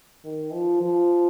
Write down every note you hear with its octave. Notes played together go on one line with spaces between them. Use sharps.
D#3
F3
F3